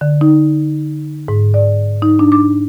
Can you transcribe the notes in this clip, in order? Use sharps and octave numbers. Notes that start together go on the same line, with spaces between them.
D3
D#4
G#2
D5
D#4
D4
D6